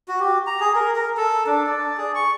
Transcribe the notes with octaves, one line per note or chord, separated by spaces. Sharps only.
F#4
G4
A#5
G#4
A#4
A#4
A4
D4
D5
G#4
C#6